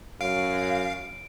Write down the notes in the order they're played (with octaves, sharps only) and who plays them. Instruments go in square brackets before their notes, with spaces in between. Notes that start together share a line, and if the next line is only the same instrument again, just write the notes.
[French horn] F#2 [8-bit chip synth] F5 [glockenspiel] D7